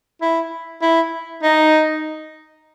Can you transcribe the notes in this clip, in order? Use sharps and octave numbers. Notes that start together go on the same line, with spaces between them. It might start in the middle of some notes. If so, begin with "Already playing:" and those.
E4
E4
D#4